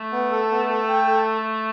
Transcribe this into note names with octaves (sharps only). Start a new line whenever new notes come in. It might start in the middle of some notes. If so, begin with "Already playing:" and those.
Already playing: A3
B3
A4
B3
A4
G5
A4